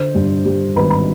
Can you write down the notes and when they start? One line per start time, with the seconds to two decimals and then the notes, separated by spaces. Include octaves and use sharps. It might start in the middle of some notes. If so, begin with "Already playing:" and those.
Already playing: D3 C5
0.15 G2
0.45 G3
0.76 G#1 B4 B5
0.90 B5